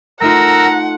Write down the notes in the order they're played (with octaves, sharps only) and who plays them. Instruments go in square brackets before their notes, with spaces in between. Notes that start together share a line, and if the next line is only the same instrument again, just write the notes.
[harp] A3 D#4 F4 [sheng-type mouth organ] A#4 E6 [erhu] F#5 [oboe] A#5